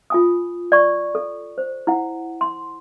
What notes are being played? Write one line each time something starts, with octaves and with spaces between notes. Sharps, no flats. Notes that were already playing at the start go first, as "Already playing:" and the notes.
F4 G#5 D#6
D5 C#6
A4
C5
E4 F#5
C6